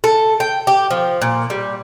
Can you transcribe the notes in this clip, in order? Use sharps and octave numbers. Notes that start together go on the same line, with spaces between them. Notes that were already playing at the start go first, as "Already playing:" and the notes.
A4
G5
G4
F3
A#2
G3